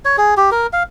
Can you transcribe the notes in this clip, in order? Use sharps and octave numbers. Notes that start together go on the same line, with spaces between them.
C#5
G#4
G4
A#4
F5